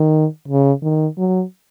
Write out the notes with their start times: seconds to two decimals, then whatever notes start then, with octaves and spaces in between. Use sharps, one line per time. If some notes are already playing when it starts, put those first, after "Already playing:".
Already playing: D#3
0.48 C#3
0.82 D#3
1.18 F#3